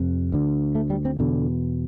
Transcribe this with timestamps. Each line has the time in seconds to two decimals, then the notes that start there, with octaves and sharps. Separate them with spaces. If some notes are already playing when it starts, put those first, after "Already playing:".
Already playing: F2 C3
0.32 D2 D3
0.75 A3
0.90 G3
1.05 C4
1.19 E2 B2 D3